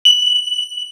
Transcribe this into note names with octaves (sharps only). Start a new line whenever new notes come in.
F#7